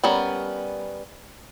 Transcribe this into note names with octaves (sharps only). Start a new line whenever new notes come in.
G3 B3 C#4 A#4